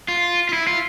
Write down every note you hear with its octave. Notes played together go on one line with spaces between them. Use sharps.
F4
F4
E4
F4